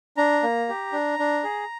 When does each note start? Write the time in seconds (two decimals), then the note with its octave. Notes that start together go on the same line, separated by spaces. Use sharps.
0.17 D4 A#5
0.43 A#3
0.69 G4
0.93 D4
1.19 D4
1.44 G#4